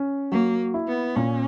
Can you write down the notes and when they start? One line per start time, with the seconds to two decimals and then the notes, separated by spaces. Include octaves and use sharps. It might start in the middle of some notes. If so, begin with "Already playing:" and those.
Already playing: C#4
0.32 F#3 A#3
0.74 E4
0.88 B3
1.16 A#2 C#4